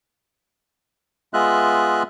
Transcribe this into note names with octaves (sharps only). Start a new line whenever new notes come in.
G#3 B3 F4 D#5 E5 F#6